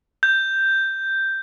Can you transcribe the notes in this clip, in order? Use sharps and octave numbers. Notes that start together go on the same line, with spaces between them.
G6